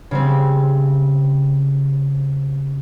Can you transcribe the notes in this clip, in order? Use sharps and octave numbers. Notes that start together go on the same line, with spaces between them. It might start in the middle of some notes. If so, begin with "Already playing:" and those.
C#3 G3 C4